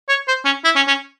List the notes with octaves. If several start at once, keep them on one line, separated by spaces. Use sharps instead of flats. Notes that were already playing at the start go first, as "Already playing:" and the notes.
C#5
C5
C#4
E4
C#4
C#4